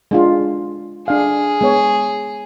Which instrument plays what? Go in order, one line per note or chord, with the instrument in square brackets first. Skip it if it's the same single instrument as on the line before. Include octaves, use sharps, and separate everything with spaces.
[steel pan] G#3 D4 F4
[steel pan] D4 F5 [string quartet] G#4
[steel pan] G#3 B3 C#5